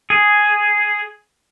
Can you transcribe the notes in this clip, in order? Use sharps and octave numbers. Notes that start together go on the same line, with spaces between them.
G#4